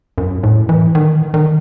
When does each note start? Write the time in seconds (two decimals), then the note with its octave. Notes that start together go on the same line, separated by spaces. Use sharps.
0.18 F#2
0.43 A2
0.69 E3
0.95 D#3
1.34 D#3